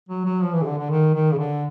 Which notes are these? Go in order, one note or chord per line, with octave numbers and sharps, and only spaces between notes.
F#3
F#3
F3
E3
C#3
D3
D3
D#3
D#3
C#3
D3